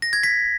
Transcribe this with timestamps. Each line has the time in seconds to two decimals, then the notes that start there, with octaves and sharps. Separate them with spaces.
0.02 A#6
0.13 G#6
0.23 B6